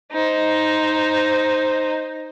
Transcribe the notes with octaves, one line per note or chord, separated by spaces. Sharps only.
D#4 C5